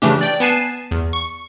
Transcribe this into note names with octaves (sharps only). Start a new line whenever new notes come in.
C#3 E3 A3 C#4 D4 G4
D5 G5
B3 B4 G#5 A5 C7
E2
C#6